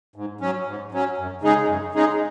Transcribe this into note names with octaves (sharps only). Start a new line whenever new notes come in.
G#2
F#3 C#4
G#2
F#3 C#4
F#2
C#3 G#3 D#4 G#4
F#2
C#3 G#3 D#4 G#4